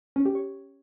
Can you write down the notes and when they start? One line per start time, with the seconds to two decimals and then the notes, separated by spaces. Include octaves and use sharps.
0.16 C#4
0.25 G4
0.35 C#5